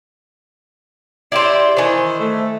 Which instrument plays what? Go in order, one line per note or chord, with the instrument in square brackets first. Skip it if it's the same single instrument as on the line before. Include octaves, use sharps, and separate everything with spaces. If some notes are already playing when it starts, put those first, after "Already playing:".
[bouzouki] E4 G4 C5 [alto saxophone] D5
[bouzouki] D#3 E3 [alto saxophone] C5
[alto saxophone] A3